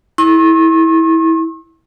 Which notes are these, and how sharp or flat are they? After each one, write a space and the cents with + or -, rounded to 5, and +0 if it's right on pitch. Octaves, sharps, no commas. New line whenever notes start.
E4 -20 C#6 -45